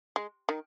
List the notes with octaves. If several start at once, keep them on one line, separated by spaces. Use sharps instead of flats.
G#3
D#3